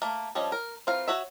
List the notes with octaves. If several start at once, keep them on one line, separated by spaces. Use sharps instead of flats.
A3 A#3
F3 G3 C#4 D4 D#5
A#4
E3 C4 F4 A#4 F5
F#4 C#5 E5